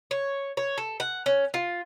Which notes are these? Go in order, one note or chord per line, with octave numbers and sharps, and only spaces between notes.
C#5
C#5
A4
F#5
C#4
F4